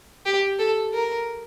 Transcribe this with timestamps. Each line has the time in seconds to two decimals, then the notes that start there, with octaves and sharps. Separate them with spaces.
0.26 G4
0.59 A4
0.93 A#4